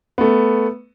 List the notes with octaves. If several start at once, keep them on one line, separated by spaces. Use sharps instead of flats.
A3 B3